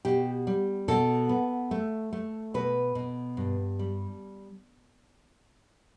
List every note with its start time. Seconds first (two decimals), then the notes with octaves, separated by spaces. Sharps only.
0.05 B2 G4
0.47 G3
0.88 B2 A4
1.29 B3
1.71 A3
2.13 A3
2.54 B2 B4
2.95 B2
3.37 G2
3.79 G3